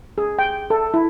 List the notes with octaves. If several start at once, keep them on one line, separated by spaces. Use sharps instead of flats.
G#4
G5
A4
E4